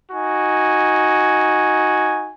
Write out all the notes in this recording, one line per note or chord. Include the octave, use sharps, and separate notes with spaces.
D#4 F#4 G#5